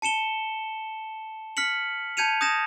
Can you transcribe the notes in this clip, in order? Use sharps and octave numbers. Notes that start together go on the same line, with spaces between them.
A5 C#7 E7 G7
F6 B6 C#7 F#7
A5 G6 G#6 C#7 D#7 F7
D#6 G6 G#6 A#6 E7